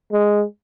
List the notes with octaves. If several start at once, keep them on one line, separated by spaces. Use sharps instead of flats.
G#3